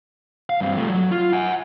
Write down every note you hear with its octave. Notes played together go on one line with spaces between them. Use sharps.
F5
G2 C4
F3 A3
F#3
F4
F#5 G#5